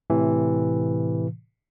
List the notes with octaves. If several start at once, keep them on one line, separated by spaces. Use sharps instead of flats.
A2 C3 E3